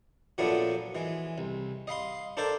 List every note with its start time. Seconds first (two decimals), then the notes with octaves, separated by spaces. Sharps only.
0.38 A#2 F3 F#3 A3 B3 D4
0.95 E3 G#3
1.38 C2
1.87 D#5 F5 B5 C6
2.37 D4 A4 A#4 C5 D5